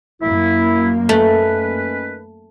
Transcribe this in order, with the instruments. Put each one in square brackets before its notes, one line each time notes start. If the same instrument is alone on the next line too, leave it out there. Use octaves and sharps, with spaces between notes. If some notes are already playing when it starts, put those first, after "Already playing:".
[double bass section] F#2 A#3 [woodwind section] E4
[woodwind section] D#3 C#4 B4 [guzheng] A3